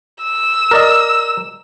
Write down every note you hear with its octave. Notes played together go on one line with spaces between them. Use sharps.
E6
A#4 D5 D#5